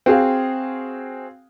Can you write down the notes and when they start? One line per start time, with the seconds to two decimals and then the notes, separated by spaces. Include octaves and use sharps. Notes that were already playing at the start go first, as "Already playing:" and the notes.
0.06 C4 F#4 G#4 F5